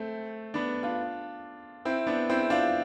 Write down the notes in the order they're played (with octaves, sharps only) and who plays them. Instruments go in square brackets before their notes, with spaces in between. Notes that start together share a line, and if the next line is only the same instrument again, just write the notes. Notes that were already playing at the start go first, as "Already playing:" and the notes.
Already playing: [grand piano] A3 C4
B3 D4
D4 F4
C4 E4
B3 D4
C4 E4
D4 F4